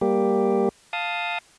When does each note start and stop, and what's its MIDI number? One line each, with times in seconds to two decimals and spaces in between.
0.01 0.69 55
0.01 0.69 58
0.01 0.69 67
0.93 1.38 77
0.93 1.38 81
0.93 1.38 87